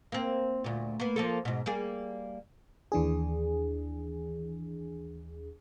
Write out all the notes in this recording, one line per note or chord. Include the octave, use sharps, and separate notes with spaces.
A#3 C4
D2 A#2
A#3 B3
F3 A#3 A4
G#2 B2
G3 A#3 G#4
D#2 E3 D4 G#4